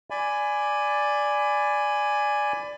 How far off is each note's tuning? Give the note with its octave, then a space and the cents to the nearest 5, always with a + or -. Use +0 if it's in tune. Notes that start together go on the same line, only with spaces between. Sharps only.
D5 +0 G#5 +0 B5 +25